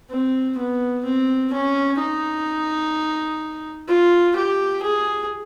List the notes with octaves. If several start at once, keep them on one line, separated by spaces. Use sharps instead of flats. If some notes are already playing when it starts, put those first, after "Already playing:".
C4
B3
C4
C#4
D#4
F4
G4
G#4